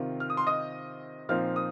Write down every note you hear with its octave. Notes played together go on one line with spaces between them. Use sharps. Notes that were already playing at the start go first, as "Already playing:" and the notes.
Already playing: C3 D#3 C4 F4
F6
D#6
C6
D#5 D#6
A#2 F3 C4 D#4 F5 F6
D#6